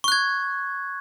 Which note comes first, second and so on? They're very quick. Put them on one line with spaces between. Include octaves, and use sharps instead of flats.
C#6 F#6 G#6